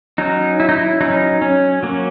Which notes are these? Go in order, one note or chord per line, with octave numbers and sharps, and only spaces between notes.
F#3 C#4 D#4
E4
D#4
E4
F#3 C#4 D#4
C#4
F#3 A#3 C#4